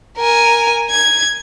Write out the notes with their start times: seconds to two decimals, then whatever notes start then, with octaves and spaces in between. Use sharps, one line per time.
0.18 A#4 G#5
0.90 G#6